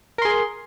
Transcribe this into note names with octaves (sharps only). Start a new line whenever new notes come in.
G#4 A#4 C6